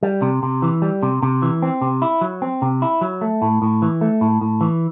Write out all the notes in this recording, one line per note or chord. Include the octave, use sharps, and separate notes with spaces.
G3
C3
C3
E3
G3
C3
C3
E3
C4
C3
E4
F#3
C4
C3
E4
F#3
A3
A2
A2
E3
A3
A2
A2
E3